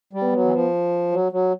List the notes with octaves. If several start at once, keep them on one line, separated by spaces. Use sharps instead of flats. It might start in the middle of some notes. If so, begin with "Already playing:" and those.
G3
B3
F#3
E3
F3
F#3
F#3